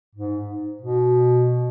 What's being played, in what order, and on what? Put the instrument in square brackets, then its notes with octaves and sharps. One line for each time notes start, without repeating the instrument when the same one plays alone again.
[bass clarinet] G#2
B2